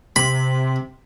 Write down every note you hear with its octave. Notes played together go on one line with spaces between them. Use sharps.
C3 B5